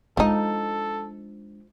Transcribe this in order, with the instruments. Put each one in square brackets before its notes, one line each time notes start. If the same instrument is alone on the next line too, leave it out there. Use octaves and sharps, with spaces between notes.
[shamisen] F3 D#4 [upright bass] G#3 D4 [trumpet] A4